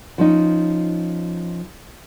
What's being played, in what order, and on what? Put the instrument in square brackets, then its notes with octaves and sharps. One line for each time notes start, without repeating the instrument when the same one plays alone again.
[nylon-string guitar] F3 C#4 D#4